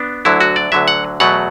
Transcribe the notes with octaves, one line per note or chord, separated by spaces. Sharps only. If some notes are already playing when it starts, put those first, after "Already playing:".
Already playing: B3 D4
D2 D3 F#3 E4
F#4
D5
D2 D3 F#3 E5
F#5
E2 B2 F#3 A3 F#5